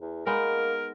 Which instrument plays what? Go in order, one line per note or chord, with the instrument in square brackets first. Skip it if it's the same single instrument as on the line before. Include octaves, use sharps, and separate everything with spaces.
[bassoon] E2
[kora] G#3 B3 D#4 [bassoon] A#3 [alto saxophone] A#4